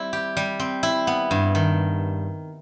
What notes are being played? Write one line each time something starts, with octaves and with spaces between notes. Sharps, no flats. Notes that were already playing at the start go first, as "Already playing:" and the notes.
Already playing: G3 C4 E4
G4
G3
C4
E4
B3
G2
D#3